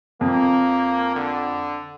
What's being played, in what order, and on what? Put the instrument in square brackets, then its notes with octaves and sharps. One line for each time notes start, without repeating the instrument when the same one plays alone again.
[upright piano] F2 [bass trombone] A#3
[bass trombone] D3